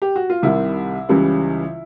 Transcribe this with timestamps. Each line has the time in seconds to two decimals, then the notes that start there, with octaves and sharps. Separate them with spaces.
0.02 G4
0.16 F#4
0.30 F4
0.43 C2 C3 D#3 G3 E4
1.09 C#2 C#3 E3 G3